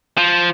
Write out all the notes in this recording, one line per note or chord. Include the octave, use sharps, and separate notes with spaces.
F3